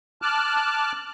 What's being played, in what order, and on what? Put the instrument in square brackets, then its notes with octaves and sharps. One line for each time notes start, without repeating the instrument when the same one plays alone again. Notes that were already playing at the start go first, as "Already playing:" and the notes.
[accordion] A5 D6 F6 F#6